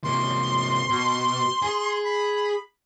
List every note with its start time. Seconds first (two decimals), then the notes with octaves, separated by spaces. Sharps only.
0.04 C3 A#3 C6
0.90 B2
1.62 G#4 G#5
2.04 B5